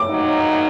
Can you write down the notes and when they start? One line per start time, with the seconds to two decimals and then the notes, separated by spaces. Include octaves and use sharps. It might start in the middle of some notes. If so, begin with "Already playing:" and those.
Already playing: D6
0.08 G#2 D#3 F#3 A#3 D#4